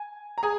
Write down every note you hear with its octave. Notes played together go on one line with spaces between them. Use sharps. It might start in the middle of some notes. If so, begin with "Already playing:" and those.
Already playing: G#5
A#5
G#4 G#5